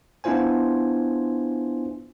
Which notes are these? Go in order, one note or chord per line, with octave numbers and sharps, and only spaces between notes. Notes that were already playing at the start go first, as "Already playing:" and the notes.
B3 D4 E4 F4 C5 G#5